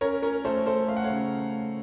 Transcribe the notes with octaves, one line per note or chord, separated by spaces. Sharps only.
C#4 A#4 C#5
C#4 A#4
A3 A4 C5
A3 A4 C5
A3 F5
F#5
C#5 F5
C#3